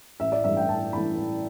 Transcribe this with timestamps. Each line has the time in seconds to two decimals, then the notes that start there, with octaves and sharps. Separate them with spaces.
0.20 A1 E5
0.32 D5
0.44 G2 E3 A3 E5
0.57 G5
0.69 A1 A5
0.93 G2 E3 A3 B5
1.17 A1